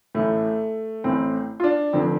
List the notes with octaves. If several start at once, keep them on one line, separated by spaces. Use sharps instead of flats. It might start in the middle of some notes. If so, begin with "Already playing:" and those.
A1 A2 A3
A1 A2 C4
F4
D4
F1 F2 D3 C4